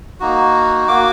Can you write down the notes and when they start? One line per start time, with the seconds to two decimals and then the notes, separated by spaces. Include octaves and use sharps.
0.20 A#3 D#4 F#4
0.88 A#3 F#4 D6